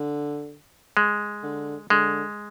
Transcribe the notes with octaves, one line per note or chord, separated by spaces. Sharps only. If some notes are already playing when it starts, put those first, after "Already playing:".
Already playing: D3
G#3
D3
D3 G#3